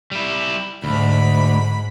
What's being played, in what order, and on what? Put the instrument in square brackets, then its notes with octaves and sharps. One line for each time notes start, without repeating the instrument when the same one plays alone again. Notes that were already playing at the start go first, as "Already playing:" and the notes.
[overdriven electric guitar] G3 E4
[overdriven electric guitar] D2 [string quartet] G#2 B5